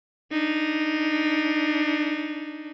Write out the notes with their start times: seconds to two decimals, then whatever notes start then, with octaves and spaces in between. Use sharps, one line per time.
0.32 D4 D#4